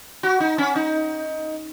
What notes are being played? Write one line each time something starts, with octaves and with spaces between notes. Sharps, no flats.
F#4
D#4
C#4
D#4